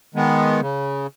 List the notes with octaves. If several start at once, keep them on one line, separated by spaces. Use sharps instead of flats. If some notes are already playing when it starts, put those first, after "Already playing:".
D#3 G#3 B3
C#3